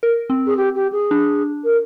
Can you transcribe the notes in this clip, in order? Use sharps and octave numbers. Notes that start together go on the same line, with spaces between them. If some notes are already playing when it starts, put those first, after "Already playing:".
A#4
C4
G#4
G4
G4
G#4
D4
A#4